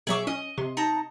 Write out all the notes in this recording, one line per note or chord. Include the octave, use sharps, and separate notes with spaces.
B2 F#3 G#4 E5 C#6 D6
C#4 D#5
C3 C6
D#4 A5 A#5